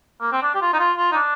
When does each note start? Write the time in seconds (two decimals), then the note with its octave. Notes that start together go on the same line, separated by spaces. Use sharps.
0.21 A#3
0.32 C4
0.42 D4
0.54 G4
0.61 F4
0.73 D#4
0.79 F4
0.97 F4
1.12 D#4
1.15 D4